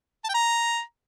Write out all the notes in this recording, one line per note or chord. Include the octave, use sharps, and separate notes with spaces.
A5
G5
A#5